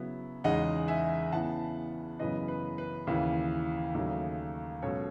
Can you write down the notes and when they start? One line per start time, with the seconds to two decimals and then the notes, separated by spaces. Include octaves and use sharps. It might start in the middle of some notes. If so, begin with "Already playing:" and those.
Already playing: C#3 F#3 B3 E4
0.44 E2 C#3 G#3 D#4 D#5 F#5
0.88 E5 G#5
1.32 C#3 E3 B3 E4 F#5 A5
2.19 F#2 C#3 E3 B3 B4 D#5
2.48 B4
2.78 B4
3.07 D#2 C#3 E3
3.95 D#2 C#3 F#3 A3 D#4
4.82 C#2 B2 F#3 C#4 A4 C#5